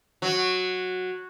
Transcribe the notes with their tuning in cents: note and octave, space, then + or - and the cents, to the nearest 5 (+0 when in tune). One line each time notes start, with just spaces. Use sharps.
F#3 -10